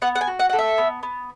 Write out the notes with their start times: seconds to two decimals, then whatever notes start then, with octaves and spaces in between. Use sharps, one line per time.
0.02 B3 F#5
0.15 F#5
0.21 G#5
0.27 F#4
0.39 F#5
0.49 A4 F#5
0.59 E5
0.78 B3
1.03 B3